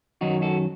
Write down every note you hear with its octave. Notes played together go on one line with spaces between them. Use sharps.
F#2 D#3 F#3 D#4 F#4
F#4 A4